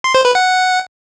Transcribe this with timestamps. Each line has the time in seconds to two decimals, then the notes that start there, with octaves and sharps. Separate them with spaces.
0.04 C6
0.15 C5
0.25 B4
0.35 F#5